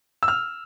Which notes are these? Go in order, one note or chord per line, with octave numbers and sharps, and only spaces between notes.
E6
F6